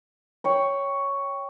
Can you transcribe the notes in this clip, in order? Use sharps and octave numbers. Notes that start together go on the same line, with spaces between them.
C#5 G5 B5 C#6